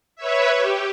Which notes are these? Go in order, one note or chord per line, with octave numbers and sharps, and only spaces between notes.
B4 C#5 E5
G4